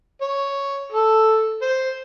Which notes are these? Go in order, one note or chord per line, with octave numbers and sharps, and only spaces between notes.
C#5
A4
C5